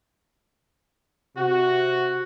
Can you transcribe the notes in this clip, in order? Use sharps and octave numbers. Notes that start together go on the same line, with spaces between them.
C3 F#4